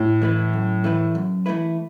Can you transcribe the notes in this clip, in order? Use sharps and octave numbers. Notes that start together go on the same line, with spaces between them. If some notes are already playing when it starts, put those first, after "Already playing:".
Already playing: A2
E3 A3 E4 B4
F#2
E3 A3 E4 B4
F#2
E3 A3 E4 B4